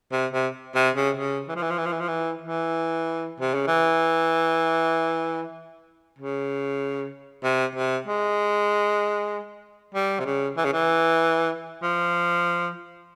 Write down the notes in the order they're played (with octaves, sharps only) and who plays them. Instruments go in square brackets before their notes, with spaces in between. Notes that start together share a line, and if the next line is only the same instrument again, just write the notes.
[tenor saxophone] C3
C3
C3
C#3
C#3
E3
F3
E3
F3
E3
F3
E3
F3
E3
E3
C3
C#3
E3
C#3
C3
C3
G#3
G3
C3
C#3
E3
C#3
E3
F3